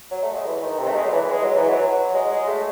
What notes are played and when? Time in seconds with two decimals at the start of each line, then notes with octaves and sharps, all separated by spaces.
0.11 F#3
0.23 A3
0.34 G#3
0.46 E3
0.63 D#3
0.79 C3
0.88 A3
0.96 G#3
1.05 F#3
1.13 E3
1.30 G#3
1.44 F#3
1.56 E3
1.69 F#3
2.14 G#3
2.32 G#3
2.48 A3